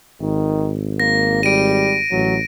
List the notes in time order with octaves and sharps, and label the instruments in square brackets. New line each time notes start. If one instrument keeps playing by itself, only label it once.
[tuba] G#1 [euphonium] D#3
[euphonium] A#3 [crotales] A#6
[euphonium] G3 [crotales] D7 D#7
[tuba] A1 [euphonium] F#3